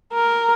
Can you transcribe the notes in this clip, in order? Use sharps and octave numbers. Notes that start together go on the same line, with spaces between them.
A#4